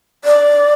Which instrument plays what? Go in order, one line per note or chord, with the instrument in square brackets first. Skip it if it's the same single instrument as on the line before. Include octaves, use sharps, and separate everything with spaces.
[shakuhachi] D5